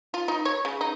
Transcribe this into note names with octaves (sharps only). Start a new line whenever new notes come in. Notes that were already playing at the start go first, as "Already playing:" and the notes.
F4
D#4
C#5
C#3
D#4